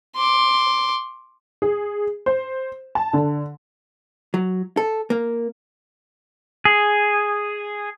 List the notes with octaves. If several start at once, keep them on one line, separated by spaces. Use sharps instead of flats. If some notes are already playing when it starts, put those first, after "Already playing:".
C6 D6
G#4
C5
A5
D3
F#3
A4
A#3
G#4